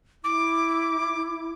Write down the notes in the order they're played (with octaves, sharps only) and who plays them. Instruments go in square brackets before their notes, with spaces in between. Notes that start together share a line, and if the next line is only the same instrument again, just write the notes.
[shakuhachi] E4 [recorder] D6